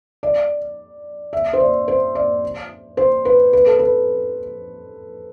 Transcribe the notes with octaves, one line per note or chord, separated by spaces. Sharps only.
D5
E5
C5
D5
C5
D5
C5
B4
B4
A4
B4